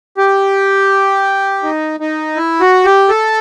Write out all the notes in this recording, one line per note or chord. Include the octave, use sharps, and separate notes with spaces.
G4
D#4
D#4
E4
F#4
G4
A4